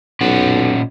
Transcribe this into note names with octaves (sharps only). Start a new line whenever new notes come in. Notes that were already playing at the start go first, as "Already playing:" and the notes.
B1 A#2 C#4 F#5